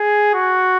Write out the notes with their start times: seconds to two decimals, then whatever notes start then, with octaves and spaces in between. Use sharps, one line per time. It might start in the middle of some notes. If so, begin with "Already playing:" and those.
Already playing: G#4
0.34 F#4